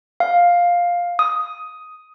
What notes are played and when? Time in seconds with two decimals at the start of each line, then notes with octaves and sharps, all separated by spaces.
0.20 F5
1.19 D#6